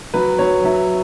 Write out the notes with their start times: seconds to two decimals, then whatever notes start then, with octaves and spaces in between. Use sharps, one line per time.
0.14 F#3 B4
0.39 F#3 C#5
0.64 F#3 E5